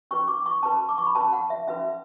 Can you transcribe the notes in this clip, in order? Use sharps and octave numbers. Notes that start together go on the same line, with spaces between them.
C#4 F#4 B4 C#6
D6
C#6
C#4 F#4 B4 A5
D6
C#6
B5
C#4 F#4 B4 A5
F#5
E5
C#4 F#4 B4 E5